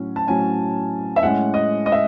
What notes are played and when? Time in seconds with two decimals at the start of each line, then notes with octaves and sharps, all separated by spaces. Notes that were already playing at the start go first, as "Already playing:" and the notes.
Already playing: A2 F#3 C#4
0.16 A5
0.27 A2 F#3 C#4 G#5
1.16 E5
1.22 A2 G#3 C#4 F#5
1.54 D#5
1.86 D#5
1.92 E5